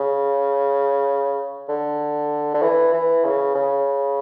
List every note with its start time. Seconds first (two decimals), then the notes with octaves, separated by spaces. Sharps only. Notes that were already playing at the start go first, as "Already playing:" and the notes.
Already playing: C#3
1.69 D3
2.54 D3
2.62 E3
2.93 E3
3.25 C#3
3.55 C#3